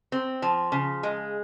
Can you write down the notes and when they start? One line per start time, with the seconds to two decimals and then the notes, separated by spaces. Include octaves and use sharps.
0.12 C4
0.42 F3
0.72 C#3
1.03 G#3